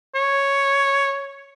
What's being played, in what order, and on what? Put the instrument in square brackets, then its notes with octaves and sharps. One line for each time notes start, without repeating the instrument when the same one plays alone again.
[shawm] C#5